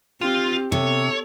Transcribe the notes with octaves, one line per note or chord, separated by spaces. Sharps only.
C4 F4 G4
C3 A4 C#5